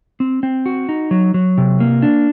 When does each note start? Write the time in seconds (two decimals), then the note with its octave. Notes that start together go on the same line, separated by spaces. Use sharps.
0.20 C4
0.43 C4
0.66 F#4
0.89 D#4
1.11 F#3
1.34 F#3
1.58 C3
1.80 A#3
2.02 D4